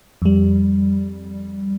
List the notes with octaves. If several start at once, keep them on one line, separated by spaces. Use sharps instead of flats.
F2 G3